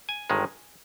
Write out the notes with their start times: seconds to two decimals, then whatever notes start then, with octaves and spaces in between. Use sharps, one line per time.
0.09 G#5
0.30 G1 G2 D#3 G#3